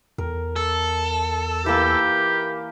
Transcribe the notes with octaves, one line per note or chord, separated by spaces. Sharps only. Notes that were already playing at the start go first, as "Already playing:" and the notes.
E2 A#4
A4
E3 A#3 G4